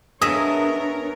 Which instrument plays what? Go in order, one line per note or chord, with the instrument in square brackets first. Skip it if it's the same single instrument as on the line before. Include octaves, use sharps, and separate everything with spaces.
[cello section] B3 A#4 C#5 [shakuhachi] D4 [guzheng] G#4 D#5 E5 [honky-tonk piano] D#6